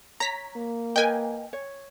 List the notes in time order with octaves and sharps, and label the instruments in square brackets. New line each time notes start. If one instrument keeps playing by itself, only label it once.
[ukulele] C#5 [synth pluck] A#5 B6
[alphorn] A#3
[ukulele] A#4 B4 D#5 [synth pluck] G5 G#5
[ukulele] C#5